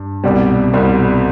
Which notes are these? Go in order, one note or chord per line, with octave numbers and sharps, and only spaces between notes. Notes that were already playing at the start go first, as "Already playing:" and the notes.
Already playing: G2
C2 B2 G3
C2 B2 G3